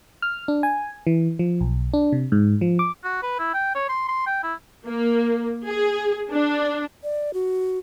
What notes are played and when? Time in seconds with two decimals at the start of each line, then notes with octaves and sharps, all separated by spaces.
0.22 F6
0.48 D4
0.63 G#5
1.07 E3
1.39 F3
1.61 B1
1.94 D4
2.13 C3
2.32 G#2
2.61 F3
2.79 D6
3.04 F#4
3.23 B4
3.39 E4
3.54 G5
3.75 C#5
3.89 C6
4.09 C6
4.26 G5
4.43 E4
4.86 A#3
5.66 G#4
6.31 D4
7.03 D5
7.34 F#4